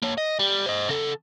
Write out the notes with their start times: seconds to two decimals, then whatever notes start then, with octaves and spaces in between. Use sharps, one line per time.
0.02 A#3 C#5
0.18 D#5
0.39 G3
0.66 C5 D#5
0.89 C#3 A4